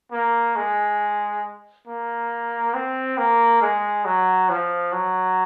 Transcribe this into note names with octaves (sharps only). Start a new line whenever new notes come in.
A#3
G#3
A#3
C4
A#3
G#3
F#3
F3
F#3